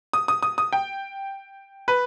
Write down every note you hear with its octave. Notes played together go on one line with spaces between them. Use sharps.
D#6
D#6
D#6
D#6
G5
B4